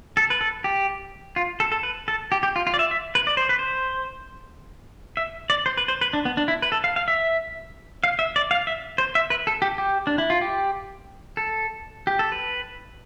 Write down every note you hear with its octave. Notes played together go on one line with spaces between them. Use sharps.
A4
B4
A4
G4
F4
A4
A4
B4
A4
G4
G4
F4
F4
D5
E5
E5
B4
D5
C5
B4
C5
E5
D5
C5
B4
C5
B4
D4
B3
D4
E4
B4
A4
F5
F5
E5
F5
E5
D5
F5
E5
C5
E5
B4
A4
G4
G4
D4
E4
F4
G4
A4
G4
A4
B4